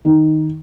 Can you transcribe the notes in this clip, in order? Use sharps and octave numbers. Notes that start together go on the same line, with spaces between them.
D#3